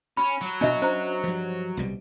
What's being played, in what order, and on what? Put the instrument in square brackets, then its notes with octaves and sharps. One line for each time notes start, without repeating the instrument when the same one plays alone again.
[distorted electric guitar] C#4 [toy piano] B5
[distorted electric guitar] F#3 F#4
[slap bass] B2 B3 [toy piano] D4 D#5 E5
[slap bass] C#4 [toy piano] C5 A#5
[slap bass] G2 F3
C2 B2 G3